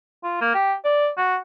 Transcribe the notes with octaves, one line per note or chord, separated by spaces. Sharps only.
F4
A#3
G4
D5
F#4